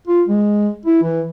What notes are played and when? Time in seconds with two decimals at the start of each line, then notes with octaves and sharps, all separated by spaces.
0.08 F4
0.28 G#3
0.86 E4
1.03 E3